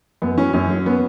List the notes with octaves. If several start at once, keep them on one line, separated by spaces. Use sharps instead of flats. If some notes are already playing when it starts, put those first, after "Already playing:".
F#2 B3
F#3 C#4
F#2 C#4
F#3
B3